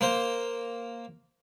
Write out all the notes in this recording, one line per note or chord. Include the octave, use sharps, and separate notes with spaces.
A#3 C5